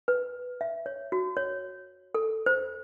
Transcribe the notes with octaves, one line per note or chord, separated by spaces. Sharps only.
B4
E5
C#5
F#4
C#5
A4
C5